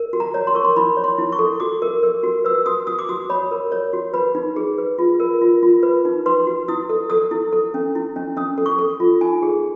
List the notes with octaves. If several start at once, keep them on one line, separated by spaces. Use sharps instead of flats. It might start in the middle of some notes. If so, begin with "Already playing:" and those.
Already playing: A#4
F#4
A#5
C#5
C6
A#4 C#6
C6
E4 B5
C#5
C6
E4
C#6
A4
F#4 D6
A#4
A#4
F#4
B4 E6
F#4 D#6
F#4 D#6
D6
F#4 D#6
C#5 B5
A#4
C#5
F#4
B4 B5
D#4
G#4
B4
F4
A#4
F4
F4
B4
D#4
B4 C6
F#4
E4 D#6
A4
A4 D#6
E4
A4
C#4
E4
C#4
C#4 D#6
A4
C#6
A4
F4
D#4 G#5
G#4